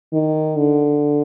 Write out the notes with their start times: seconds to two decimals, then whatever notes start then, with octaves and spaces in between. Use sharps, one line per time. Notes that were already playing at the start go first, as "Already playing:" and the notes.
0.13 D#3
0.57 D3